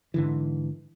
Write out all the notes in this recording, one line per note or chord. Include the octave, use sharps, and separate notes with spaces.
G#2 D3 E3